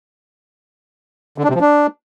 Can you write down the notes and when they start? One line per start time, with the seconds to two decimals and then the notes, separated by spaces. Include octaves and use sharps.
1.38 D3
1.44 D4
1.49 C3
1.55 F3
1.61 D4